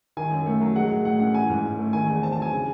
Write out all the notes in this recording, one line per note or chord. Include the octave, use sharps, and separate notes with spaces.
D#3 G#5
F#2
A3
F#3
G#3 F#5
A2
A2 F#5
C#4 F#5
E3 G#5
G#2
C#4
A3
D#3 G#5
E2
C4 A5
A5
F#3 G#5
C#3